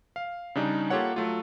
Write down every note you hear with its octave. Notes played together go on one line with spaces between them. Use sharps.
F5
C#3 G3 D4 D#4
A#3 F4 G4 A4 C#5 F#5
F#3 A3 F4